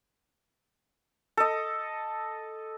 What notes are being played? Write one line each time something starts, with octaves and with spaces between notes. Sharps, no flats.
A4 D#5